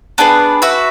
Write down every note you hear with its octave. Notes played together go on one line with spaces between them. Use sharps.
B3 D4 G#4 B4
F#4 B4 E5